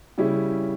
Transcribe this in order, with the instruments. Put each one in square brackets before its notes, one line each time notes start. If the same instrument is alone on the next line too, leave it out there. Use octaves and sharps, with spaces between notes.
[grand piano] C#3 G3 C#4 E4 G4